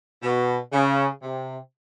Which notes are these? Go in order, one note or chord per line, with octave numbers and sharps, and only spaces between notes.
B2
C#3
C3